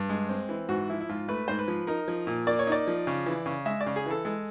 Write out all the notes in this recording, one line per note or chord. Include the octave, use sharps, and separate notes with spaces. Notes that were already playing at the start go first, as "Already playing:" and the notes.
Already playing: G2
G#3
C4
E3
G#2 F#4
F3 E4
E4
G#2 F4
A3 B4
G#2 C5
B4
F3
D#4 A#4
F3
A#2
A#3 D5
C#5
D#4 D5
F3
C#3
E3
C#3
G#3 E5
D5
C#3
G#4
E3 A4
G#3 A4